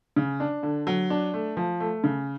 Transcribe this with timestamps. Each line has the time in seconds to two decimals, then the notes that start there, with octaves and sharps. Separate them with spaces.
0.16 C#3
0.40 D4
0.63 D3
0.87 F#3
1.10 D4
1.34 A3
1.57 F3
1.80 A3
2.04 C#3